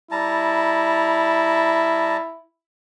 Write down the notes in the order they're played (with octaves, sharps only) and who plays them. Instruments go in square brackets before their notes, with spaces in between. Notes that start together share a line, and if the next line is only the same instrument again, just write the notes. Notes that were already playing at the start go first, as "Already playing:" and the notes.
[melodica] G3 A5 A#5 [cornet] E4